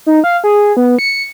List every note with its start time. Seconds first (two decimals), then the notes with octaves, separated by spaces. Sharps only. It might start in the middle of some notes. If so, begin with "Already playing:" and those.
0.06 D#4
0.24 F5
0.44 G#4
0.77 B3
0.99 C#7